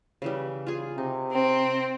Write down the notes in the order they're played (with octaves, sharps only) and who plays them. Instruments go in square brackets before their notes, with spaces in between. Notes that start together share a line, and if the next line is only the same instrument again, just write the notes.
[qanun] C#3 E3 G3
F4 G#4
[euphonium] C3 [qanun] D#4
[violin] C4